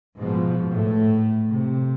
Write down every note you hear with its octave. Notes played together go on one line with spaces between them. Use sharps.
G#2 B2 F3
A2 A3
C3